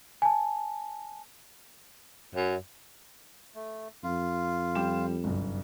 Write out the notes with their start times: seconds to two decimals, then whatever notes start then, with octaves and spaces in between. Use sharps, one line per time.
0.22 G#5 A5
2.35 F#2
3.55 A3
4.03 F2 F4
4.75 G3 G5 E7
5.24 G1 C2 F#2